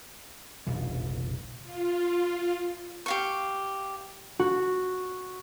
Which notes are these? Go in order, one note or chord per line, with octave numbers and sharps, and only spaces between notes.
F1 A#1 B2 E3
F4
G4 F5 C#6
F#4